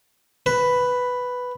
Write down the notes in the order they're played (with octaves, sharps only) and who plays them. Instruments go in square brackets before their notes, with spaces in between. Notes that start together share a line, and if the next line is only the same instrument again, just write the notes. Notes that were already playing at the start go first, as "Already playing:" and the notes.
[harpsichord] B4